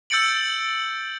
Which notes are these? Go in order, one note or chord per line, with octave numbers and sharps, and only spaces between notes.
E6 G6 A6 C#7 D7 F#7